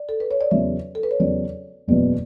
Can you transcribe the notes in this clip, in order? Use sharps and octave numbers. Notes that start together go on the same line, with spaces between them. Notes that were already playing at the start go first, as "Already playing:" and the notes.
Already playing: D5
A4
B4
C#5
D5
E2 C#3 F#3 E5
A4
B4
C#5
E2 C#3 F#3 D5
F#1 E2 B2 F#3 B3 D5